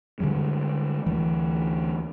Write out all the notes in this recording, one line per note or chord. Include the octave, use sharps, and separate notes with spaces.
D3 D#3 G3 G#3
D2 E3